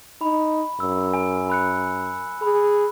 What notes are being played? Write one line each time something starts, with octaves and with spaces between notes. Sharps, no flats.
D#4 B5
F#2 E6
G#5
B5 F#6 C#7
G#4 B5